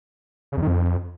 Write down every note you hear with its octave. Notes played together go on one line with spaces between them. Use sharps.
C#3
E2
D#3
F2